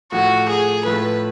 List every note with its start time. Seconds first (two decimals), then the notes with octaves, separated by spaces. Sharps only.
0.12 A2 F3 A3 F#4
0.49 G#4
0.85 A2 F3 A3 B4